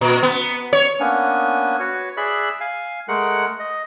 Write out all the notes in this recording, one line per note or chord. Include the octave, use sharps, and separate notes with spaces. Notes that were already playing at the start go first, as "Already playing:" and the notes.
A#2
B3
C#5
A#3 B3 C#4 D4 G#5
F#4 B4 C#5
G#4 D5 E5 B5 E6 F#6
F5 G#5
G#3 A3 A#4 F#5 F#6
D#5